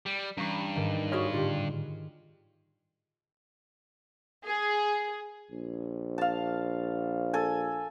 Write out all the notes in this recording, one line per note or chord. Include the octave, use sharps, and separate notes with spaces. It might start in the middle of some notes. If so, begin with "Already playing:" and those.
G3
G2 E3 G3 C#4 A#5 C#6
G#2 D#3
F#4 G#4 C#5 D#5 G#5 C6 C#6 F6
A2 D3 F4 G4
G#4
A#1
F5 A5
A4 G#5